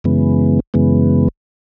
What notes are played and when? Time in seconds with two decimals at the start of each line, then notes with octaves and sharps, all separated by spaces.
0.04 F#2 C#3 E3 G#3 B3
0.74 F#2 C#3 E3 G#3 B3